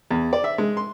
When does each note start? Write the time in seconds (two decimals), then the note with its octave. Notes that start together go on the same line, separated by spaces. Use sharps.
0.11 E2
0.33 D5
0.44 E5
0.58 G#3
0.77 C6